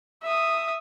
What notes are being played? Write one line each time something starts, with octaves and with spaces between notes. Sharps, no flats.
E5 D#6